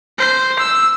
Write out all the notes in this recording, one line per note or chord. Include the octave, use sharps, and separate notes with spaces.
C5
E6